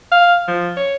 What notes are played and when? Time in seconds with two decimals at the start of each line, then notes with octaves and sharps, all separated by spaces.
0.11 F5
0.48 F3
0.77 C#5